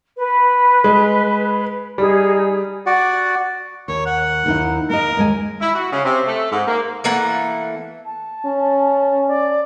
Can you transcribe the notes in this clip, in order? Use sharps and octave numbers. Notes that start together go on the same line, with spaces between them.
B4
G#3
G3 D#4 G#4
F#4 D5 F#5
D#2 C#5
F#5
D#2 D#4 E4
A#3 A#4 D#5
D#2 G#3 G#5
E4
F#4
C#3
C3
A3
G#2
A#3
E3 A3 A#3 F#5
A5
C#4
D5